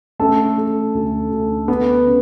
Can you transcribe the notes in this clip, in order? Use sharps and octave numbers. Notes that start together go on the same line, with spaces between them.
A3 C#4 A4
A3
D2
D2
B3 B4
C#3